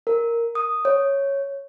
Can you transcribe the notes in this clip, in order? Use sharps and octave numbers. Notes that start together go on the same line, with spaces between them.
A#4
D#6
C#5